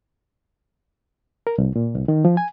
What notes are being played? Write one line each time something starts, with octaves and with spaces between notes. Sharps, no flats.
A#4
C2
A#2
C2
D#3
F3
G#5